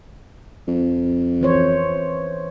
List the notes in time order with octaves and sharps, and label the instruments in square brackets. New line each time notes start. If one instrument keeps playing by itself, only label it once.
[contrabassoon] F2
[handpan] E3 C5 C#5